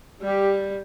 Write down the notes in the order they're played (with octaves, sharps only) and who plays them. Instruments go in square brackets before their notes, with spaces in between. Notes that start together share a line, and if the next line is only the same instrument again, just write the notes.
[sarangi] G3 [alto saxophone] G4